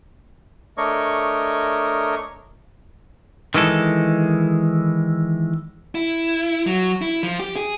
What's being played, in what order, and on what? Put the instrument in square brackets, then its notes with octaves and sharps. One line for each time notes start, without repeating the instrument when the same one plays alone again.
[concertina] A3 D4 A#4 C#5 D#5 C#6
[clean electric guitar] D#3 E3 G#3 A4
[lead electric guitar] E4
F#3
E4
F3
G4
G#4